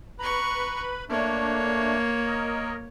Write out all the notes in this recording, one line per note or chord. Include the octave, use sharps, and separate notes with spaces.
B4 A#5 B5 C#6
A3 A#3 D4 C#5
A#4 D#5